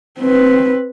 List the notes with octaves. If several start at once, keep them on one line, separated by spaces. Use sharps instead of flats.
C4 B4